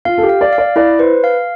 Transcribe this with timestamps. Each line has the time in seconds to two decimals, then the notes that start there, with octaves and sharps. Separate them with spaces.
0.05 F4 F5
0.18 A4
0.23 G4
0.29 F5
0.41 D5
0.53 F5
0.58 D5
0.76 E4 D5
0.99 B4 C5
1.24 F5